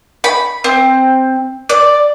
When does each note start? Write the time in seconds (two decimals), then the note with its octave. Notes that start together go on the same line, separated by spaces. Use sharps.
0.24 B5
0.64 C4
1.69 D5